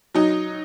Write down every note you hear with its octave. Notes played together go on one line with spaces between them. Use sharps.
F#3 D#4